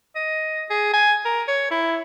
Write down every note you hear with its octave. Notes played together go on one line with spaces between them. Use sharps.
D#5
G#4
G#5
A#4
C#5
E4